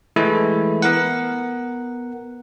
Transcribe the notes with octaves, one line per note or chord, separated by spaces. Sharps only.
E3 G#3 A3 E4
B3 A#4 F#5